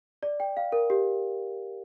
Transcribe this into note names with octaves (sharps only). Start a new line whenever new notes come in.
D5
G5
F5
A#4
G4